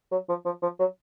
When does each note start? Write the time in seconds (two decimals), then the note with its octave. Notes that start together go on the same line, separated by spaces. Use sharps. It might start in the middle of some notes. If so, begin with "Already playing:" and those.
0.11 F#3
0.29 F3
0.45 F3
0.62 F3
0.79 F#3